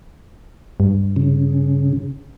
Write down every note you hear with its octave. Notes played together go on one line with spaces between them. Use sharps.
G2
C#3